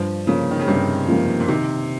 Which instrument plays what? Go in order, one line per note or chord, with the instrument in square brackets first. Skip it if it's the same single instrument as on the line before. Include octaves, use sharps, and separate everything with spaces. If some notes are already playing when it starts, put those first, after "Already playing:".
Already playing: [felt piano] G2 [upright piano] F3
[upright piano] C#3 [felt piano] F3 A#3
[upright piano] D#3
C#3
[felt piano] G2 [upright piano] C3
[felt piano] F3 A#3
[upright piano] A#2
[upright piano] C3 [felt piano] D#3